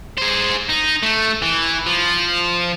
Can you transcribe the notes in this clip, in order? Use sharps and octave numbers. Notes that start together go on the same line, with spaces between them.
G#4 C5
D#4
A3
E3
F3